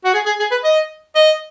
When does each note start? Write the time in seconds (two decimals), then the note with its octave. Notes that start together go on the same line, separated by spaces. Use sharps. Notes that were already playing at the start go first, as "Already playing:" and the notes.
0.04 F#4
0.14 G#4
0.26 G#4
0.39 G#4
0.51 B4
0.64 D#5
1.15 D#5